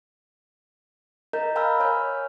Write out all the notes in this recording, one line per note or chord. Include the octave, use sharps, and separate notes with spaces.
A#4 D#5 A#5 G6
F5 G#5 A#5 B5 E6 F6
C#5 G#5 F6 G6